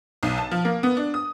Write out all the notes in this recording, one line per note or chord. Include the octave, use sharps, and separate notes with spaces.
B1
A5
F3
A#3
B3
D4
D#6